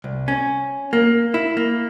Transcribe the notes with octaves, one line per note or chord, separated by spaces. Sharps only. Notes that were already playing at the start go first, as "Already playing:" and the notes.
C2
C#4
A#3
E4
A#3